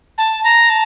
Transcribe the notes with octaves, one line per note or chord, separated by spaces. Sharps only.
A5
A#5
A5